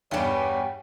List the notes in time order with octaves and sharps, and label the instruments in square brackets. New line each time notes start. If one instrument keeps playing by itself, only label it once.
[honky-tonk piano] E2 G2 [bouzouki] G3 B3 [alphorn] C#5 [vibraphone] G5